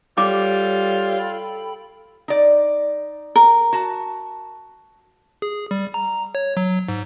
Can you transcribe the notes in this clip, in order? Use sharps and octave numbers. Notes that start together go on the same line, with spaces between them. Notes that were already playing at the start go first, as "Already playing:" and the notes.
G3 F4 G4 A4 C#5 D6
A4 G5 B5
D#4 D5
A#4
F#4 A5
G#4
G3
A#5
C#5
F#3
G#2